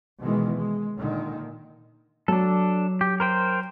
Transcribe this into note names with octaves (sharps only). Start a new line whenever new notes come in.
B2 D#3 E3 G#3
G#3
A#2 D3 D#3
F#3 D4 A4
G4
A#4 C5 G5